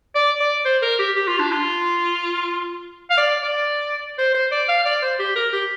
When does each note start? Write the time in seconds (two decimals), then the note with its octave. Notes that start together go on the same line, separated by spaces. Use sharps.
0.15 D5
0.40 D5
0.65 C5
0.82 A#4
0.99 G4
1.16 G4
1.28 F4
1.40 D4
1.52 F4
3.10 F5
3.17 D5
3.43 D5
4.18 C5
4.35 C5
4.52 D5
4.69 F5
4.86 D5
5.02 C5
5.19 G4
5.36 A#4
5.53 G4